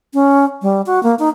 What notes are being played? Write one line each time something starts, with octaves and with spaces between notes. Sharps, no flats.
C#4
G3
F#4
A#3
D#4